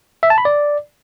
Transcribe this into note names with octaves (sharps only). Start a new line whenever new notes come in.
E5
A5
B5
D5